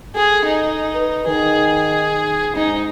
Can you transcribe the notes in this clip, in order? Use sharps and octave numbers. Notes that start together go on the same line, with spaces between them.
G#4 A4
D#4
B4
D#3 G#4
G#2 D#4